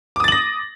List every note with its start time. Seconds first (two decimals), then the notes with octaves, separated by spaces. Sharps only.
0.16 D6
0.20 D#6
0.24 A6
0.28 F#7
0.32 A#6